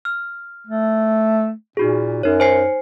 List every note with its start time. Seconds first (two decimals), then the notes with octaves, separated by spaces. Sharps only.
0.05 F6
0.67 A3
1.77 A#2 D#4 F#4 G#4
2.23 F#2 D#4 C#5
2.40 C5 G#5 C7